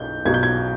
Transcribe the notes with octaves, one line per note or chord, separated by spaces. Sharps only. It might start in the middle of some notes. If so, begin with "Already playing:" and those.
Already playing: B1 B2 G6
B1 B2 F#3 G#6
G6
G#6